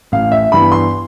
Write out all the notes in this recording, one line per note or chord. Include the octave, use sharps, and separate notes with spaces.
A1 F5
E5
G2 E3 B3 B5
C6